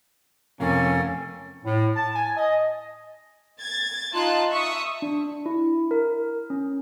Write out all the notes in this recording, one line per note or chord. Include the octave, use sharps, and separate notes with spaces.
F2 C3 A#3 C#4 A4 G5 G#5
A2
A5
G#5
D#5
G#6 A6
D#4 F4 A5 C6 F#6
E5 C#6 D#6
D4
E4
A#4
C#4